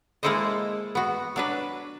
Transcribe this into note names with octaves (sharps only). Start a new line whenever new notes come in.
G#3 A#3 E4 A4 C5 D#5
B3 F#4
F#3 D4 B4